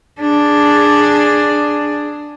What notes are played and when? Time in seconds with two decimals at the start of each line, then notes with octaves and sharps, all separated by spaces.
0.21 D4 G#4